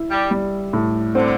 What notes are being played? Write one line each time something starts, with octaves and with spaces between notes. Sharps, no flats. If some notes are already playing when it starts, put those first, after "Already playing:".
Already playing: E4
G3
G3
A2
D3 C4